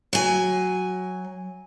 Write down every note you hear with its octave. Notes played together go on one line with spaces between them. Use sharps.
F#3 G#5